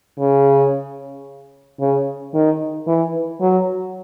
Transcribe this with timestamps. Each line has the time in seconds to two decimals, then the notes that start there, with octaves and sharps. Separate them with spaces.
0.19 C#3
1.80 C#3
2.34 D#3
2.87 E3
3.41 F#3